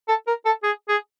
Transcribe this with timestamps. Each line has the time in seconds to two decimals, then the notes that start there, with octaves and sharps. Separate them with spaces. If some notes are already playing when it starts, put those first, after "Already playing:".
0.08 A4
0.27 A#4
0.45 A4
0.63 G#4
0.89 G#4